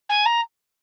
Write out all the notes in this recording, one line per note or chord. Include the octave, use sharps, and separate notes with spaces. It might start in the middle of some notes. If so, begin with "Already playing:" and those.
G#5
A#5